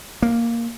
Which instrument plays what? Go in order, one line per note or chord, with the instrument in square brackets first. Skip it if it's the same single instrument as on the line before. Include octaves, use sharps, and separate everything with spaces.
[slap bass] A#3